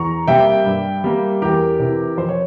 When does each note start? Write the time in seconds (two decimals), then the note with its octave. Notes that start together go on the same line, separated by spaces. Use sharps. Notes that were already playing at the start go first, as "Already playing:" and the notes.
Already playing: E2 A#5 C#6
0.28 C3 G3 A#3 E5 G5
0.65 G2
1.04 G3 A#3
1.42 E2 G4 A#4
1.80 C3 E3
2.17 F2 C5
2.29 C#5